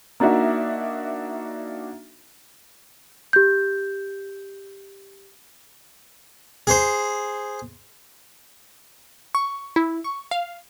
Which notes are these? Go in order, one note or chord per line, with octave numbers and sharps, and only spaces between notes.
A#3 D4 D#4 F#4 E5
G4 G6
G#4 C5
C#6
E4
C#6
F5